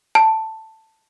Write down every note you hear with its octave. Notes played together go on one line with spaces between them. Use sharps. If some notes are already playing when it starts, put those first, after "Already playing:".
A5